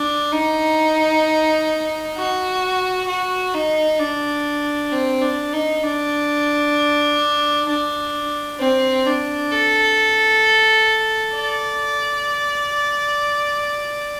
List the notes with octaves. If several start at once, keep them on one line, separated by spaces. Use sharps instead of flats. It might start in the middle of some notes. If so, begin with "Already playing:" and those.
Already playing: D4
D#4
F#4
F#4
D#4
D4
C4
D4
D#4
D4
D4
C4
D4
A4
D5